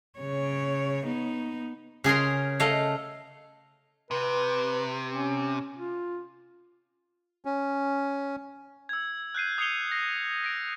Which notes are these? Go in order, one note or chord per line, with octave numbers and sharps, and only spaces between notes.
C#3 C#5
B3 D#4
C#3 G#4 A#4 C6
A3 D#5 F5
C3 B4
C#4
F4
C#4
E6 G#6
F#6 G6 C7 D#7
D#6 G#6 C7 C#7 F7 G7
A#6 C7
A#6 D7